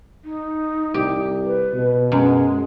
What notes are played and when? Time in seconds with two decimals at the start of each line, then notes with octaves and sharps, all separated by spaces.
0.25 D#4
0.94 C2 G4
1.44 B4
1.73 B2
2.12 F#2 G#3